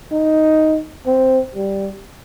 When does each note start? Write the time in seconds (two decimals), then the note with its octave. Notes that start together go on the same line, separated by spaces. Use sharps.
0.12 D#4
1.06 C4
1.55 G3